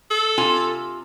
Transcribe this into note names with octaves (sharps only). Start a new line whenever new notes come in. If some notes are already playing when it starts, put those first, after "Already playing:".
A4
C3 F4 G#5